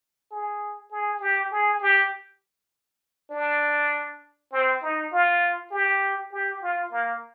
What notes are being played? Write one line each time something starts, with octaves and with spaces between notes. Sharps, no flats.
G#4
G#4
G4
G#4
G4
D4
C4
D#4
F4
G4
G4
F4
A#3